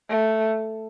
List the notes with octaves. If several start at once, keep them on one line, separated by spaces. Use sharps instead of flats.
A3